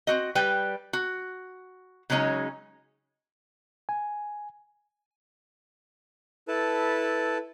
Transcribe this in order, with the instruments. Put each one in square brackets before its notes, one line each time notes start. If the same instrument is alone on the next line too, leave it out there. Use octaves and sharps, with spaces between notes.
[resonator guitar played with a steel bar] C4 F#4 D#5
G3 B4 G5
F#4
C#3 F#3 G#3 C#4 D#4
[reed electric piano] G#5
[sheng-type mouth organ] E4 A4 B4 A5